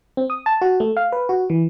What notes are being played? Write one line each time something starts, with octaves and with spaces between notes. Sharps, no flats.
C4
D#6
A5
F#4
A3
F5
B4
F#4
E3